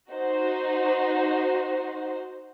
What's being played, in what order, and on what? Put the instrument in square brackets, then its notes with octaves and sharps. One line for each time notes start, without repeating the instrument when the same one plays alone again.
[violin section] D#4 F#4 C5